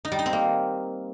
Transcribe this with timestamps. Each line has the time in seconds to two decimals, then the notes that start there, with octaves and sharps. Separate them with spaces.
0.05 D#4
0.12 G3
0.19 D#4
0.26 C4
0.33 A#3